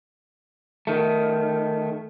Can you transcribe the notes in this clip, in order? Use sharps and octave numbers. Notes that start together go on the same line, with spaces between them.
D#3 A3